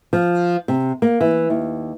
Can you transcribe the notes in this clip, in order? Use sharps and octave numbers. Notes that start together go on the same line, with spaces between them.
F3
C3
A#3
E3
D#2